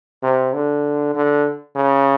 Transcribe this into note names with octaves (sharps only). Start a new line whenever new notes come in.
C3
D3
D3
C#3